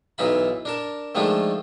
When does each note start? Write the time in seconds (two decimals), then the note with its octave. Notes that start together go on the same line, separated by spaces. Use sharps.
0.18 B1 E3 D#4 F4 B5
0.65 D4 A#4 A5
1.15 D#3 F3 G#3 A3 D4 F4